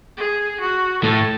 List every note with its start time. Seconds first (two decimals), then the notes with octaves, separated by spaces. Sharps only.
0.17 G#4
0.60 F#4
1.03 A2 A4